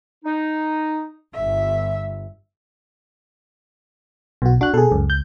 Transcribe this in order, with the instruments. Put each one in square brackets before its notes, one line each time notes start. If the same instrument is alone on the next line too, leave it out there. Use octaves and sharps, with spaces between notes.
[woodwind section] D#4
[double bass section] G1 [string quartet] E5
[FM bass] B1 [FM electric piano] B2 F#4
[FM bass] D4 [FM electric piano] F#4 F#6
[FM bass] B2 [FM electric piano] G#4 A4
[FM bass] C#2 [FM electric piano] F#2
[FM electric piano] G6